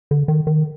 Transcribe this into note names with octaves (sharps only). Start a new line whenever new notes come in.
D3
D#3
D#3